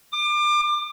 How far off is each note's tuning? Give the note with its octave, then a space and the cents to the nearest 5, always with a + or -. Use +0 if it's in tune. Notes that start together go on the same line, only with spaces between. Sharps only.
D6 +30